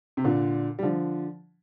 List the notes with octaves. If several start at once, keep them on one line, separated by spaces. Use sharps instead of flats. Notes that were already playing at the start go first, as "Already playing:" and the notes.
C3
A#2 D3
G3
D3 F3